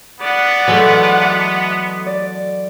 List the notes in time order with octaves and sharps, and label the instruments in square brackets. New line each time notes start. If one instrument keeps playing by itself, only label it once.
[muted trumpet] B3 [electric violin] D5 F#5
[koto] E3 G#3 A3 [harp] F#3
[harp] D5